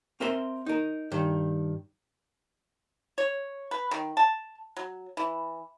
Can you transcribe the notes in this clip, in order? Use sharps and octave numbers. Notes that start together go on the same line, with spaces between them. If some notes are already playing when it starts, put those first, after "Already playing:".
C4 A#4 E5 C6
D#4 A#4
G2 D#3
C#5
B4
D#3
A5
F#3
E3